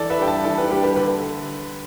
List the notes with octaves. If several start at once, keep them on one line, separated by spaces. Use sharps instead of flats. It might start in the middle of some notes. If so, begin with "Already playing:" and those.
Already playing: E3 A4 D5
B4 E5
G3 D4 G5
E5 A5
E3 A4 D5
G4 B4
G3 D4 G4 B4
G4 B4
D3 B4